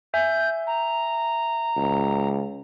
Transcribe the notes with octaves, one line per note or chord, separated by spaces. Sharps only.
E5 G#5 G6
A#5
C#2